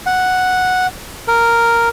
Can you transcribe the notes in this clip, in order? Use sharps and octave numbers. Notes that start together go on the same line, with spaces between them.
F#5
A#4